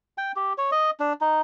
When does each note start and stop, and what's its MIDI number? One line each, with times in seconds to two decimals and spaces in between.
0.18 0.32 79
0.36 0.53 67
0.58 0.70 73
0.72 0.90 75
1.00 1.13 62
1.21 1.41 63